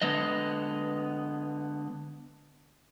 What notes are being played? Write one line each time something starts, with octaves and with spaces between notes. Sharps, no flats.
D3 G#3 B3 D#5